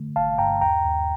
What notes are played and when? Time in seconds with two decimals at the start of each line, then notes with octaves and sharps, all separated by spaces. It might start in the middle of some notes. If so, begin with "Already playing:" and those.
Already playing: D3 A3
0.16 G1 F5 A5
0.38 G2 G5 A#5
0.61 D#2 G5 A#5
0.84 D#2